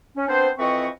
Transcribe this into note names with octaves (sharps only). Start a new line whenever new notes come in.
C#4
B3 C4 D4 C5
F2 E3 C4 B4 D#5 C#6